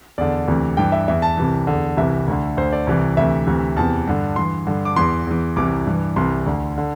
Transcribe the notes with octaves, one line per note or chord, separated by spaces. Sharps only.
E2 D3 D5
D2 C3 E3
G2 E3 G5
E5
E2 E3 E5
A5
C2 C3 E3
E2 D3
C2 C3 E3 E5
D2 D3
D2 D3 C5
D5
C2 C3 E3
D2 C3 E3 E5
D2 C3 E3
E2 C3 E3 A5
G2 D3
G2 E3 C6
G2 D3
D6
E2 E3 C6
E2 E3
C2 C3 E3 D6
G2 E3
C2 C3 E3 C6
D2 D3
D3